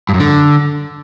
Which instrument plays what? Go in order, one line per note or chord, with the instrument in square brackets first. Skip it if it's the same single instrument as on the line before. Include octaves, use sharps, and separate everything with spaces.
[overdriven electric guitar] G2
F#2
D3